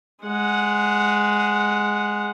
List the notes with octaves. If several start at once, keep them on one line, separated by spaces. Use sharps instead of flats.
G#3 F#5